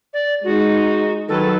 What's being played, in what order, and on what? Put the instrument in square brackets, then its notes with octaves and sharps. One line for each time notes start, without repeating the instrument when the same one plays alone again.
[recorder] D5
[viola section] G#3 D#4 [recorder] F#4
[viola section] D#3 F#3 B4 [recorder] A4